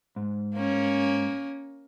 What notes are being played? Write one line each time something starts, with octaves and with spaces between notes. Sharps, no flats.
G#2
A#3 C#4